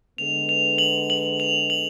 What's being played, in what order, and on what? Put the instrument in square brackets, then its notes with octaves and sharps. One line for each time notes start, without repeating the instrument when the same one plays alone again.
[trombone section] D3 G#3 B3 [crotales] F7
[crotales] F7
F#7
F#7
F7
F#7